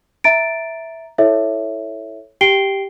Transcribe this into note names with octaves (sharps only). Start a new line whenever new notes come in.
E5 A#5 A6 D7
E4 A4 C#5 E5
G4 G5 C7 D7 G7